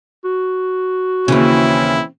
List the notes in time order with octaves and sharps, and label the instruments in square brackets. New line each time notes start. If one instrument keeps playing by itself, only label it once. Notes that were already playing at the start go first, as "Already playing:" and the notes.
[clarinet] F#4
[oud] D#2 C#3 [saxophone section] E3 C4 C#4 [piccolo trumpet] E4